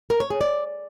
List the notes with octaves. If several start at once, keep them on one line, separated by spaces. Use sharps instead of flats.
A#4
C#5
G#4
D5